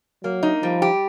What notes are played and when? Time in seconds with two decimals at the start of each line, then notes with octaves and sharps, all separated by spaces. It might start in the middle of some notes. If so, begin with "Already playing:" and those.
0.23 F#3 A#3
0.43 D#4
0.62 F3 G3
0.82 G4